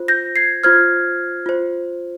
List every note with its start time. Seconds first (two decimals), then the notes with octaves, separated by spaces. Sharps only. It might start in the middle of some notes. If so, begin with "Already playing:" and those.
Already playing: F4 C5
0.08 G6 A#6
0.36 G#6 C7
0.64 F4 C5 F6 G#6
1.46 F4 C5